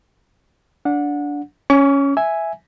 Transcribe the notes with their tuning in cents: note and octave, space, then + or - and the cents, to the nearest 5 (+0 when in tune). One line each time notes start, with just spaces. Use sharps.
D4 -15 F#5 -25
C#4 +0 C#6 +40
E5 +0 G#5 +0